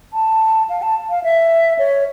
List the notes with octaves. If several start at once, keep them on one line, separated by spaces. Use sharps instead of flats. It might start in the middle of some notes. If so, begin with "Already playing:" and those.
A5
F5
A5
F5
E5
C#5